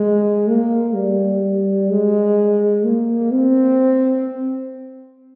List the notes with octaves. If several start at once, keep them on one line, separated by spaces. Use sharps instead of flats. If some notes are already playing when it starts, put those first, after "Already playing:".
Already playing: G#3
A#3
G3
G#3
A#3
C4